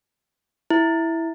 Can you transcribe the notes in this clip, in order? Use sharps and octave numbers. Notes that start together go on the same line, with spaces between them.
E4